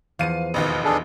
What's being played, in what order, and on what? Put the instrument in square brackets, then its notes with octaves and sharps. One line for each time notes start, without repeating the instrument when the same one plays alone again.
[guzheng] E2 F3 F#5 [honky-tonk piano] F5 D#7
[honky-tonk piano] A1 D#2 B2
[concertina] D4 G#4 A4